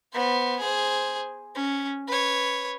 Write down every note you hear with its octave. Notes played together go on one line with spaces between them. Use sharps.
B3 C5
G#4 C5
C#4
B4 C#5